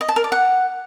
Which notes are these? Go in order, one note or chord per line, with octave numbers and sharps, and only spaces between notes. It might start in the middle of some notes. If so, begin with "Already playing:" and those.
D#5
A5
A#4
D5
F#5